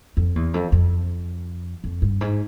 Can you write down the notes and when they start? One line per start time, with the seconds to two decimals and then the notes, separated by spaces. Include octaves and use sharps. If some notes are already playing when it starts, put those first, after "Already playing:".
0.17 F2
0.36 E2
0.54 F2
0.72 F2
1.84 F2
2.02 G2
2.21 G#2